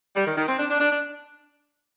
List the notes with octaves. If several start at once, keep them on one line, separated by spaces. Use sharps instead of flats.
G3
D#3
D#3
C4
D4
D4
D4
D4